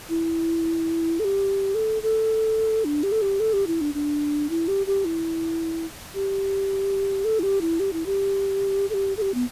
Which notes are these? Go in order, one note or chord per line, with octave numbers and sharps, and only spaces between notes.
E4
A4
G4
A4
A4
D4
G4
A4
G4
A4
G4
E4
D4
D4
E4
G4
G4
E4
G4
A4
E4
G4
E4
G4
E4
G4
A4
G4
A4
G4
B3